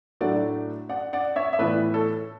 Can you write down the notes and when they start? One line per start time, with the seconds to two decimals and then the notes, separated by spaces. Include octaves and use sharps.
0.21 A2 F#3 A3 D4 D5 F#5
0.89 D5 F#5
1.13 D5 F#5
1.36 C#5 E5
1.53 E5
1.59 A2 E3 B3 E4 B4 D5
1.94 A4 C#5